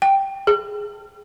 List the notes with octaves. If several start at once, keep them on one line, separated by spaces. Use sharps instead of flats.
G5
G#4